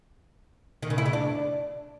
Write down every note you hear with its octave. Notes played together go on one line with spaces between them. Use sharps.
D#3
C#3
E4
C#3
D4